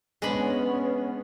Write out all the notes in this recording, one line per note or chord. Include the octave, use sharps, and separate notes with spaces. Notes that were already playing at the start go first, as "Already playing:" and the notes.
G#3 B3 C#4 D4 B5